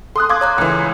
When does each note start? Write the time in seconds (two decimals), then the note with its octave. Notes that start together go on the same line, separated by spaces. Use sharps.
0.16 A4 C6 D#6 F#6
0.30 F5 C6 D6 G#6
0.41 C#5 A#5 F#6
0.58 C#2 E3